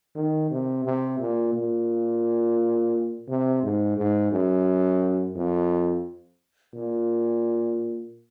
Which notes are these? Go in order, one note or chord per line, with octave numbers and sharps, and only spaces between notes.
D#3
C3
C3
A#2
A#2
C3
G#2
G#2
F#2
F2
A#2